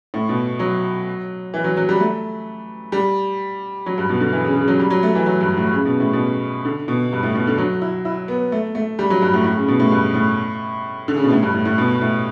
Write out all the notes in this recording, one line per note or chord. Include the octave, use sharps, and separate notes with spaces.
A2
B2
F#3
E3
F#3
F#3
G3
A3
G3
F#3
G2
B2
D3
E3
C#3
C#3
F#3
G3
F#3
A3
E3
F#3
G2
A2
C#3
B2
A2
B2
D3
B2
G2
A2
B2
D3
F#3
E4
E4
B3
A3
A3
G3
F#3
G2
A2
A2
C#3
B2
A2
G2
A2
D3
C#3
B2
A2
G2
A2
A2
B2
A2